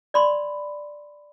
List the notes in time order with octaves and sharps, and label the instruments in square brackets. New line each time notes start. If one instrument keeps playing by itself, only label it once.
[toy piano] D5 B5 C6